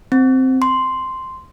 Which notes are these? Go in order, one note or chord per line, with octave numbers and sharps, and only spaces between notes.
C4
C6